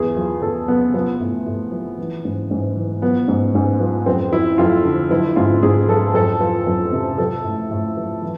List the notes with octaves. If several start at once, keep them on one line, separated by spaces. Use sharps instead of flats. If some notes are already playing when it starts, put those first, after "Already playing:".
Already playing: E2 G#4
F3
E2 A4
C3 B3
F3 B3
A2
A2
F3
E3
G#2
G#2
E3
F3 B3
G#2
G#2
F3
F2 C4
F3 E4
F2 F4
D3
F3 E4
G#2 F4
G#2 G#4
F3 A4
F2 A4
F3
F2
C3
F3 A4
A2
A2
F3
E3